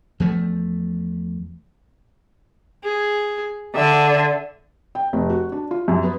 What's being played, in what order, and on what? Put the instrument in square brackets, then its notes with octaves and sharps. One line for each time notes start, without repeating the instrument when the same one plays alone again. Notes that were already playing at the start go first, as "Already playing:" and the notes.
[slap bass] E2 F3 A3
[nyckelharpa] G#4
[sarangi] D3 [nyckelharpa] E5
[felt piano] G5
F1
F#4
D4
F4
F#2
B3